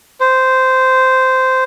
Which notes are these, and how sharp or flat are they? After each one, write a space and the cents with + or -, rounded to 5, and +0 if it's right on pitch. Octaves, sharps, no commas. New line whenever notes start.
C5 -10